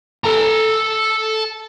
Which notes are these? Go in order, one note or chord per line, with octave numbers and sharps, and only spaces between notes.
A4 A#5